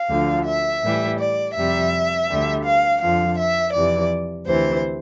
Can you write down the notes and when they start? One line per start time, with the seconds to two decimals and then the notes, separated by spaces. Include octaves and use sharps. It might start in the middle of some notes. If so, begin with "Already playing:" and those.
Already playing: F5
0.09 D2 D3 F3
0.45 E5
0.82 A2 E3 G3
1.19 D5
1.54 F2 C3 G3 E5
2.27 D2 D3 G3
2.64 F5
3.00 F2 D3 F3 F5
3.36 E5
3.72 F2 C3 E3 D5
4.45 D2 C3 E3 C5